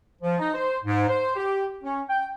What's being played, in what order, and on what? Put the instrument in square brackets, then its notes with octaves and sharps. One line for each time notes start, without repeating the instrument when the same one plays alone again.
[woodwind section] F3
D#4
C5
G#2
C5
G4
C#4
G5